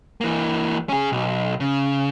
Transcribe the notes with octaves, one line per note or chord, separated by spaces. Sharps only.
E3 A#3
C#4 G#4
B1
C#3